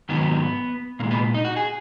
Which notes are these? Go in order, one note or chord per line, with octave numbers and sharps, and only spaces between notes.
G#2 D#3 F#3 B3
A#2 G#3 A#3
B3
D#4
F#4
G#4